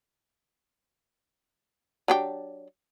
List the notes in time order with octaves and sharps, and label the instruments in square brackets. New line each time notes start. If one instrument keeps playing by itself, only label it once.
[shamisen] F#3 D4 G4